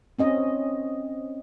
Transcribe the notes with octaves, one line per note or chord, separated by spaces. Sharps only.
C4 C#4 D#5